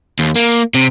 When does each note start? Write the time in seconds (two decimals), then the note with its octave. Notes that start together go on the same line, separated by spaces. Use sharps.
0.19 D#2
0.36 A#3
0.74 C3